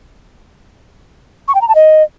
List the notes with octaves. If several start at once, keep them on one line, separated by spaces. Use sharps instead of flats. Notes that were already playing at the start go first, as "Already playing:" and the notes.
C#6
G5
A#5
A5
D#5